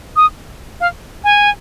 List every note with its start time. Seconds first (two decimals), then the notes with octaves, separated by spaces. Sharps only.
0.16 D#6
0.81 F5
1.24 G#5